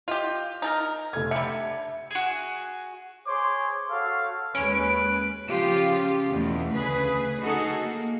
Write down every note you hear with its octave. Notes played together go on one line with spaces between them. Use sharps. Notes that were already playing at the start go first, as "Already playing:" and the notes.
F4 G4 D#5
D#4 A4 A#4
F1 A3 G#6
D3 G3 E5 C#7
F#4 G#4
G#4 C5 C#5 C6 D6
F#4 A4 C#5 F5
D#2 G#3 C#4 B4 D7
C#3 F3 F4 G4
E2 B2 A3
D2 C#3 G#4 B4
D#4 F#4 G#4 A4
A#3